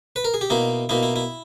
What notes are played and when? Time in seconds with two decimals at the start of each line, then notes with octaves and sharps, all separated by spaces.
0.16 B4
0.25 A#4
0.34 G#4
0.41 G4
0.50 B2 A#3 D#4 E4
0.89 B2 A#3 D#4 E4
1.03 E4
1.16 E4